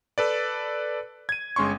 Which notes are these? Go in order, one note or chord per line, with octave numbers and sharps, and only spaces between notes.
A4 B4 D5
G#6 D#7
G1 G#3 C#4 C6 C#6